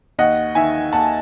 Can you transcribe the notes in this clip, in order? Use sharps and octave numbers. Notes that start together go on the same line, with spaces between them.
D#2 D#5 F#5
D#3 E5 G#5
D#2 F#5 A5